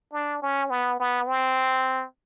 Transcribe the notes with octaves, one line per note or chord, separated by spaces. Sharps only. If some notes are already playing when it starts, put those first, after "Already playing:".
D4
C#4
B3
B3
C4